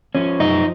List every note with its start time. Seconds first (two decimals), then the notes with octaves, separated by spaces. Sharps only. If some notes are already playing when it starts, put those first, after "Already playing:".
0.15 F3 C#4
0.39 F#2 D#4